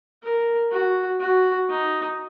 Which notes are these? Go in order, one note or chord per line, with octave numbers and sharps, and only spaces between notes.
A#4
F#4
F#4
D#4